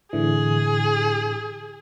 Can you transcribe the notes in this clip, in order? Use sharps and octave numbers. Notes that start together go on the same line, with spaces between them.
A2 D3 E3 G#4